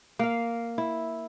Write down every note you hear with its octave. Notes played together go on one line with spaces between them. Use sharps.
A#3 F5
E4